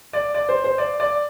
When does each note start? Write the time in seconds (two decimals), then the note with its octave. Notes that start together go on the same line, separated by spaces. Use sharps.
0.13 D5
0.34 D5
0.49 C5
0.64 C5
0.78 D5
1.00 D5